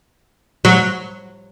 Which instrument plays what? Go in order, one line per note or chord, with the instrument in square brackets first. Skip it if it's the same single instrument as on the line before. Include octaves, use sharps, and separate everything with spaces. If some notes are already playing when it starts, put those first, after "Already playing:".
[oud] F#3